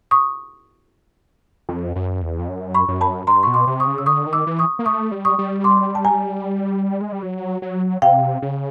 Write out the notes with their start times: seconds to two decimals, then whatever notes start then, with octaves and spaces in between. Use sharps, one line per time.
0.11 C#6 D#6
1.69 F2
1.96 F#2
2.22 E2
2.39 F2
2.48 F#2
2.74 B5 C#6
2.88 F#2
3.01 A5 B5
3.27 G2 A#5 C6
3.43 B2 C#6
3.54 C6 D6
3.67 C3
3.80 C#6 D#6
3.87 C#3
3.98 E6
4.06 D3 C#6 D#6
4.26 D#3
4.33 D6 E6
4.47 E3
4.59 C#6 D#6
4.79 A#3
4.86 A3 C#6 D#6
5.11 G3
5.25 C#6 D#6
5.38 G3
5.64 C6 D6
5.95 A5
6.05 G#5 A#5
7.01 G#3
7.12 G3
7.22 F#3
7.62 F#3
8.02 C3 F5 G5
8.42 C#3